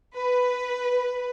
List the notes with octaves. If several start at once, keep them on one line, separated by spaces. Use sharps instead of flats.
B4